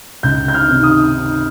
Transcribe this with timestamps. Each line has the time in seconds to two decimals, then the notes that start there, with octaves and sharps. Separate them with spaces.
0.23 C#2 G6
0.48 G6
0.54 F6
0.69 C3 D#3
0.83 D#6